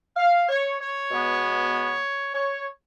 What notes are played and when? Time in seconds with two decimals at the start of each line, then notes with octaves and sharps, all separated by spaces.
0.17 F5
0.49 C#5
0.79 C#5
1.09 B2 G#3 B3
2.33 C#5